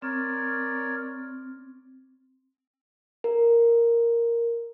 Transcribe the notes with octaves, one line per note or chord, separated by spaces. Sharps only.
C4 A#4 C#5 D5
A#4